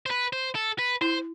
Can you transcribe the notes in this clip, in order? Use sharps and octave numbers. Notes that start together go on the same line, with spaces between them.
C5
B4
C5
A4
B4
E4 C5